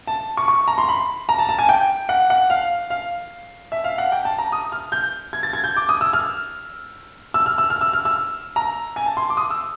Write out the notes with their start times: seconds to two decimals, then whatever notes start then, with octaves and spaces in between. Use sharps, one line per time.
0.07 A5
0.37 C#6
0.48 C#6
0.68 A#5
0.78 C6
0.89 B5
1.29 A#5
1.38 A5
1.49 A5
1.59 G#5
1.69 G5
2.09 F#5
2.30 F#5
2.50 F5
2.90 F5
3.72 E5
3.84 F5
3.98 F#5
4.12 G5
4.25 A5
4.38 A#5
4.52 D#6
4.72 F6
4.92 G6
5.33 G#6
5.43 A6
5.53 G#6
5.64 G6
5.76 D6
5.89 D#6
6.01 E6
6.13 F6
7.34 E6
7.46 F6
7.58 E6
7.70 F6
7.81 E6
7.93 F6
8.05 E6
8.56 A#5
8.96 G#5
9.06 A5
9.17 C6
9.30 D6
9.37 D#6
9.50 E6